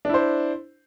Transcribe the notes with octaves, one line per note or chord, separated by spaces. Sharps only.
D4 E4 C5